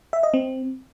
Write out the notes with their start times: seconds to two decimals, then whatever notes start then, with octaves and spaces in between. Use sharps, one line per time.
0.13 E5
0.23 D#5
0.34 C4